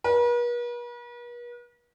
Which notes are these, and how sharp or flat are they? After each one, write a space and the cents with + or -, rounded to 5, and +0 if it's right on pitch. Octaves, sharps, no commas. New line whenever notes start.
B4 -45